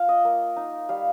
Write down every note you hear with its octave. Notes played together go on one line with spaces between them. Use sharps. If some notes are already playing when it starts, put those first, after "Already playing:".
Already playing: F4 F5
D#5
A#3
D#4
G3 F5